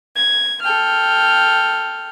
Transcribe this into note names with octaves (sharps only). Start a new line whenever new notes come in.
G#6
A4 G5 F6